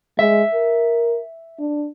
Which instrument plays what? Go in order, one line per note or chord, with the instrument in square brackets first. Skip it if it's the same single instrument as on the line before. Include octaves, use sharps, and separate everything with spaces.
[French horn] G#3 [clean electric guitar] E5
[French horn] A#4
D4